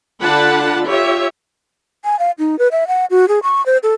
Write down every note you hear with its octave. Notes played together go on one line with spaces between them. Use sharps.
D3 D4 F4 F#5 A5 B5
F4 G4 C#5 E5
G#5
F5
D#4
B4
E5
F#5
F#4
G#4
C#6
C5
A4